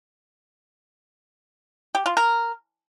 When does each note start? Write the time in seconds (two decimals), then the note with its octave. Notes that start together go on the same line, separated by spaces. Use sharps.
1.95 G4
2.06 F4
2.17 A#4